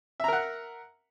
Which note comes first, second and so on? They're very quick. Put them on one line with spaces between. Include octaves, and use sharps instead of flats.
E5 A#5 A#4 F#5